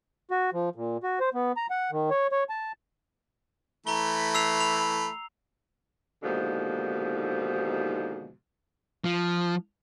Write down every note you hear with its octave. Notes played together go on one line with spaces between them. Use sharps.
F#4
F3
A#2
F#4
C5
B3
A#5
F#5
D#3
C#5
C#5
A5
E3 A3 A#5 B5 G7
E6 C7 F7
F7
D#2 G#2 B2 D3 F3
F3